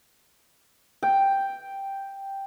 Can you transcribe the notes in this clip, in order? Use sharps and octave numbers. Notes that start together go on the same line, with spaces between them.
G5